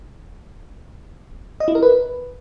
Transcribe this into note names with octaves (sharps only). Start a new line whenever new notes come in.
D#5
E4
A#4
B4